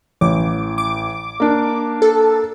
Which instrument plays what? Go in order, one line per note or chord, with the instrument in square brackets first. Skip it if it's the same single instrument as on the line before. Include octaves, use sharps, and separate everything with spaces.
[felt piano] A1 [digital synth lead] D6
[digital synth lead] D6
[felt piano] A#3 D4
[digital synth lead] A4